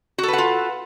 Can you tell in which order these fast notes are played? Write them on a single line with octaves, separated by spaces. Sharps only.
F#4 A4 B4 F#5 F4